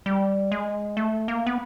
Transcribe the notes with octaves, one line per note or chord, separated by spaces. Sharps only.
G3
G#3
A3
A#3
B3